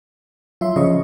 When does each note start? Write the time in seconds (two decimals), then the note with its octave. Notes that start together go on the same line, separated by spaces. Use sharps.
0.61 F#3 F4 E5 C6
0.76 C#3 F3 D#5 C#6